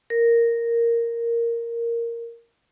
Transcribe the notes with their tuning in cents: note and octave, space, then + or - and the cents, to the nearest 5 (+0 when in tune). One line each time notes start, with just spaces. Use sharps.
A#4 -5